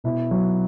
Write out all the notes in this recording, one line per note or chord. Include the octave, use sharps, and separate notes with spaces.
B2 E4
F#3